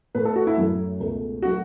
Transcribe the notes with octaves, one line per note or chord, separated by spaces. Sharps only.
A2 A3 B4
A4
F#4
E4
F#2 F#3 A3
C#2 B2 A3
F#3 A3 F#4